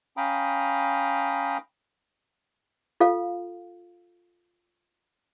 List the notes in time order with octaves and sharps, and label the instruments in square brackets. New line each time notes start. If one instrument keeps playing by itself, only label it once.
[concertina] C#4 F5 G5 A#5 B5 D#6
[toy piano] F4 A4 F5